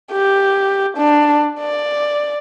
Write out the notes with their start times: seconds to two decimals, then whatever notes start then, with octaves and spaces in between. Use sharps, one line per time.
0.12 G4
0.97 D4
1.61 D5